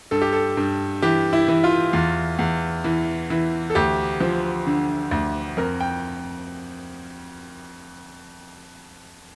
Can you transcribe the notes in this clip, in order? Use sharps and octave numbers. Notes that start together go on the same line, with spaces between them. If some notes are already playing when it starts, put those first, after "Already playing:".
G2 A4
G4
A4
G2
E3 G4
E4
E3
F4
E2
E2
E3
E3
A4
D2 G4
F3
D3
D2
F2 A#4
G5